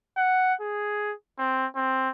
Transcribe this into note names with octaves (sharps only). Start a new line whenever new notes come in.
F#5
G#4
C4
C4